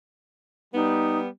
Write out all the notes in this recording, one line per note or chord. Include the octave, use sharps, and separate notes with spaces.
G3 B3 D#4